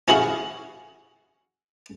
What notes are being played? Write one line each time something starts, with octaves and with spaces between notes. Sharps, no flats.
C#4 E4 F#4 G#4 F5 F#5